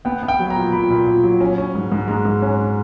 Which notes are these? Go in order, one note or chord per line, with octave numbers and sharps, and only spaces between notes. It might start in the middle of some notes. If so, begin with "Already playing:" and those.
B3 G5
B3
G5
F#3
A#5
A#2
A#2 B5
A#2
A#2
F#3
C#4
C#4
G#2
G#2
G#3 A#5
G#2
C#4